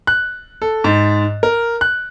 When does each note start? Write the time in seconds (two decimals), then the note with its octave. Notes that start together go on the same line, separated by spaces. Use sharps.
0.07 F#6
0.62 A4
0.84 G#2
1.43 A#4
1.81 F#6